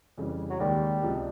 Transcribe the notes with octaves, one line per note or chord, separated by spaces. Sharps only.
F2 C#3 E3 G3
F#3
D#2 D#3 G3 G#3
C#2 C3 F3 G#3